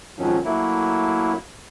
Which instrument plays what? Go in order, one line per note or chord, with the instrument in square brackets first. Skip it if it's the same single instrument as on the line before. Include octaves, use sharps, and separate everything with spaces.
[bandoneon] F2 G#2 D#3 F3 F#3 C#4
F#3 A3 A#3 E4